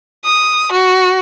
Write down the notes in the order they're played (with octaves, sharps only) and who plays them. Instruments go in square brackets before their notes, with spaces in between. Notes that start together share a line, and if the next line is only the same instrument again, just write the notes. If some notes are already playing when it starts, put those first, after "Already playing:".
[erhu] D#6
F#4